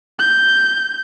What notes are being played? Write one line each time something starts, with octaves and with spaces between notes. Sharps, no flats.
G6